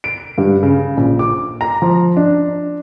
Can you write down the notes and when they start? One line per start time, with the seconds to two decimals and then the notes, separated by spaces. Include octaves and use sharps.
0.04 D7
0.38 G2
0.63 C#3
0.97 A#1
1.19 D6
1.61 A#5
1.82 F3
2.17 D4